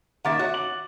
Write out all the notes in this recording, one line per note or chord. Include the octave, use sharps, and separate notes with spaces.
D#3 A#3 E5 F#5 D6 A6
F#4 C#5
D6 F#7